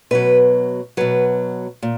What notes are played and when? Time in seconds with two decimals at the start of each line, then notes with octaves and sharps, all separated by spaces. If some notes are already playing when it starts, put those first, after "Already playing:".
0.11 B2 F#3 B4
0.97 B2 F#3 B4
1.82 A#2